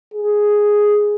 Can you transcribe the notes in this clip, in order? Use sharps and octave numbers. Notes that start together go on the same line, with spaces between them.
G#4